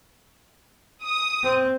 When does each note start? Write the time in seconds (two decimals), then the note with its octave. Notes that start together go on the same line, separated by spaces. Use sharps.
1.02 D#6
1.43 C4